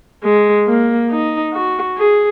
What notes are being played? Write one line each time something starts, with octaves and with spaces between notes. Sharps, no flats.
G#3
A#3
D#4
F#4
G#4